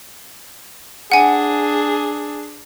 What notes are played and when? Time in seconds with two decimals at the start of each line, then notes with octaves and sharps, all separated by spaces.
1.12 D4 G#4 F#5 G#5